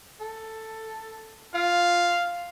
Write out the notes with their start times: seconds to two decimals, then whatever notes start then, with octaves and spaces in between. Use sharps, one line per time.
0.20 A4
1.54 F4 F5